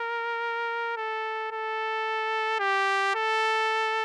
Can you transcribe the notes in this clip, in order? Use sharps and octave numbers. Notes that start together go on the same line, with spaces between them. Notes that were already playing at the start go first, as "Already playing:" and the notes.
Already playing: A#4
A4
A4
G4
A4